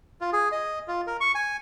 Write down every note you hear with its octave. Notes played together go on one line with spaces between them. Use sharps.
F4
G#4
D#5
F4
A#4
C#6
G#5